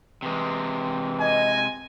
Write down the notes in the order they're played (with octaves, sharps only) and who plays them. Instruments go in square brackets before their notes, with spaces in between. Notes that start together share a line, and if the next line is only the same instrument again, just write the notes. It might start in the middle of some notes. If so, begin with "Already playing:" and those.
[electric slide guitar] C3 G#3 [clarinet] E3
[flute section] D#5 [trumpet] G#5